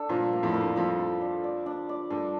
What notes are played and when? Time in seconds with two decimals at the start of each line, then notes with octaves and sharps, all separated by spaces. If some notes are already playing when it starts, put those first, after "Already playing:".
Already playing: D4 A4
0.09 G2 A#2 F3
0.33 A#3
0.43 F2 A2
0.54 A#3
0.61 G2
0.76 F2 F3
0.99 A4
1.21 D4
1.44 D5
1.66 D4
1.89 D5
2.10 G2 A4